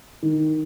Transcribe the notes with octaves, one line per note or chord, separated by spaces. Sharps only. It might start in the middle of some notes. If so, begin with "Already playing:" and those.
D#3